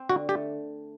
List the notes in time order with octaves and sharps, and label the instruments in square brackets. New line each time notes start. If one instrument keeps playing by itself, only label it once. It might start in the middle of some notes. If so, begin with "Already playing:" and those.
Already playing: [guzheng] C4
[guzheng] D3 [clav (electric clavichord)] F#4
[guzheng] A3 [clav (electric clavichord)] G4